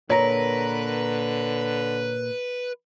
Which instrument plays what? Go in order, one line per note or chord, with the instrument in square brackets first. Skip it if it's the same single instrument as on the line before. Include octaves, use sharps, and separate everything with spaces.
[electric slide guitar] A#2 A#4 [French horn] D3 [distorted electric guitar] B4 [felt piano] C#5 A#5